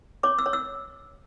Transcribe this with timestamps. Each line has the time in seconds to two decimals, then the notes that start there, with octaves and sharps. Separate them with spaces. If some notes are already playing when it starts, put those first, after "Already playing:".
0.23 C#5 D6
0.39 E6
0.46 C#5
0.53 E6